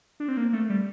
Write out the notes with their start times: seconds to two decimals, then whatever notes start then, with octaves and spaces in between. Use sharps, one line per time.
0.20 D4
0.28 C4
0.37 A#3
0.53 A3
0.70 G3